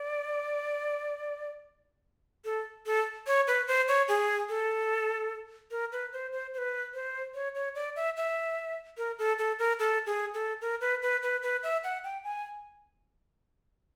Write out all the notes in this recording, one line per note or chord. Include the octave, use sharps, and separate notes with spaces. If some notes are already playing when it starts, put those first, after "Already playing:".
Already playing: D5
A4
A4
C#5
B4
C5
C#5
G#4
A4
A#4
B4
C5
C5
C5
B4
C5
C#5
C#5
D5
E5
E5
A#4
A4
A4
A#4
A4
G#4
A4
A#4
B4
B4
B4
B4
E5
F#5
G5
G#5